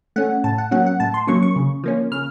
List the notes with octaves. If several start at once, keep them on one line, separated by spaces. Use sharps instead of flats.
A3 C#4 F#5
A2 A5
F#5
F#3 A#3 C#4 F#5
F#5
A2 A5
C6
F#3 A#3 C#4 C#6
C#6
C#3
F3 A#3 C#4
C#3 F6